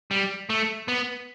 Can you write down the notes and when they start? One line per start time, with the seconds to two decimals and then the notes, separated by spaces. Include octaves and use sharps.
0.11 G3
0.50 A3
0.88 B3